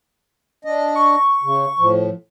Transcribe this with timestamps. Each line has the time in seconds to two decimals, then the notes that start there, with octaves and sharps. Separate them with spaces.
0.65 D4 D#5
0.95 C#6
1.43 C#3
1.79 A2 F3